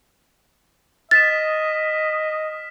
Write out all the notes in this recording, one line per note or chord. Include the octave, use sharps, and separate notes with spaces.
D#5 F6 A6 B6 E7